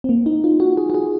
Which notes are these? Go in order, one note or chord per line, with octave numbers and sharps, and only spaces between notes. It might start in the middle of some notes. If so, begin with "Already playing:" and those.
C4
A#3
D#4
F4
F#4
G#4
F#4
G#4